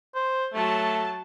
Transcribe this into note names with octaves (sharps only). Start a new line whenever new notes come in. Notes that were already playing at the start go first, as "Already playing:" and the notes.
C5
F#3 A3 A5